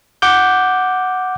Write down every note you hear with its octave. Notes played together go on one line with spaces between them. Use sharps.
F#5 D6 G6